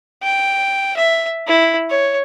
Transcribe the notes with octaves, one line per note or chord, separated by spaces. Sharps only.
G5
E5
E4
C#5